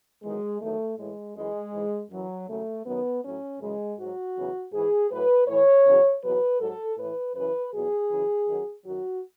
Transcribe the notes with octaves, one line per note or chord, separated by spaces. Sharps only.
E2 D#3 F#3 G#3
E2 D#3 F#3 A3
A2 E3 G#3
F#2 E3 G#3
G#2 E3
F#2 E3 F#3
D#2 C#3 F#3 A3
F#2 D#3 F#3 B3
A2 F#3 C#4
F#2 C#3 E3 G#3
G#2 F#3 F#4
E2 C#3 F#3
G#2 E3 G#4
A2 F#3 B4
A2 E3 C#5
E2 C#3 F#3
E2 B2 F#3 B4
G#2 F#3 A4
A2 E3 B4
F#2 C#3 E3 B4
E2 B2 F#3 G#4
F#2 C#3 E3
F#2 D#3 F#3
F#2 D#3 F#3 F#4